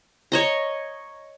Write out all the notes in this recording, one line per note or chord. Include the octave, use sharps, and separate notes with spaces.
C#5 D#5 A#5